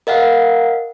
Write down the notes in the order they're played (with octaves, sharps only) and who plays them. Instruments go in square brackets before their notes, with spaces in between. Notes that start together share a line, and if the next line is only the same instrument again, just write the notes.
[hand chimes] A#4 D#5 F5 F#5